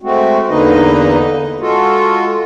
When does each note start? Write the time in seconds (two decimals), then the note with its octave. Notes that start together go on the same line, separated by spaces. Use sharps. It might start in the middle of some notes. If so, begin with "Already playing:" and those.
0.01 G#3 A3 C4 F#4
0.49 E2 D3 A#3 D#4 B4 D#5
1.60 G#3 F4 F#4 A4